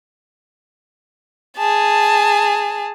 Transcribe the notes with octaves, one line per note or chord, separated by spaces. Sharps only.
G#4 A5